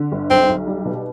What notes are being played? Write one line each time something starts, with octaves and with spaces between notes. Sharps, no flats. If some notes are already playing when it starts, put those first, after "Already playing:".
Already playing: D3
G1
B1 C4
B1
G3
B2